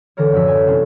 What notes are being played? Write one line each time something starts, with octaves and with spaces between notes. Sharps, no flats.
D3 E3 A4 A#4 C#5
F#2 A2 F3 F#4 E6 B6
E5 G#5
C3 E3 A3 C4 C#4 E4